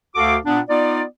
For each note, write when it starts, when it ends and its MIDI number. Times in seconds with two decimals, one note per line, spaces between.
0.15 0.36 38
0.15 0.36 66
0.15 0.36 69
0.15 0.36 77
0.15 0.36 86
0.45 0.60 46
0.45 0.60 59
0.45 0.60 62
0.69 1.02 59
0.69 1.02 63
0.69 1.02 65
0.69 1.02 74